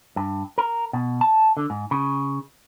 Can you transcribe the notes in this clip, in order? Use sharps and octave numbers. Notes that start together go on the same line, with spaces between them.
G2
A#4
B2
A5
D3
G#2
C#3